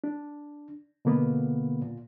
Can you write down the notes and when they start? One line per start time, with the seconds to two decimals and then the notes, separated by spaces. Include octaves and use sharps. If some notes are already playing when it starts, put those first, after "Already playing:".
0.04 D4
1.05 B2 D3 A#3 B3
1.82 A#2